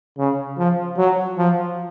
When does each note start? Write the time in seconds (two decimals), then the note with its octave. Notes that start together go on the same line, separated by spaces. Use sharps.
0.18 C#3
0.58 F3
0.97 F#3
1.38 F3